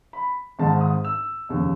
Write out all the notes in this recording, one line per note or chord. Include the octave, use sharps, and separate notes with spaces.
B5
G#1 G#2 D#3 A5
D#6
E6
F1 D#2 C#3